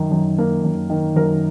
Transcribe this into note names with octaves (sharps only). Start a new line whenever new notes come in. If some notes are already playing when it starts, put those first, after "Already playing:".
Already playing: F#2 D#3
F#2
A#3
F#2
D#3
F#2 A#4